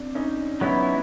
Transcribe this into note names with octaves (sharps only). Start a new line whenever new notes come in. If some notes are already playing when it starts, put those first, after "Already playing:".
Already playing: C4 D4
C#4 D#4
F#3 B3 C#4 D#4 E4